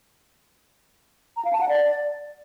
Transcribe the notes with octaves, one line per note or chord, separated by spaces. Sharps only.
A#5
F5
A5
F#5
D5